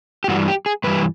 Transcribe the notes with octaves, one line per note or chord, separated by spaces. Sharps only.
G4
G2 E3 G3 F#4
G4
G#4
G2 E3 G3 B4